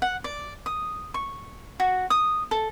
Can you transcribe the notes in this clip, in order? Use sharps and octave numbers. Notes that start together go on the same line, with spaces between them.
F#5
D5
D#6
C#6
F#4
D#6
A4